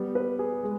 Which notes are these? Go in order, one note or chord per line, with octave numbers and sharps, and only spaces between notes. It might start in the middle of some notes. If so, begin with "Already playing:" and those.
Already playing: G3 B3
B4
G#4
G#3